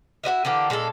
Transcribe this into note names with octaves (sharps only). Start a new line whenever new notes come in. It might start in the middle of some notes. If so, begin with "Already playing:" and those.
E4 F#4 D#5 E5
D3 E3 A#3 G4
A#2 G#3 C#4 A4